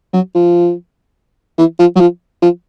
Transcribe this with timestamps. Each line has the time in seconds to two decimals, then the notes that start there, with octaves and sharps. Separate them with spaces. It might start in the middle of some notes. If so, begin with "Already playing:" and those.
0.13 F#3
0.35 F3
1.58 E3
1.79 F3
1.96 F#3
2.00 F3
2.42 F3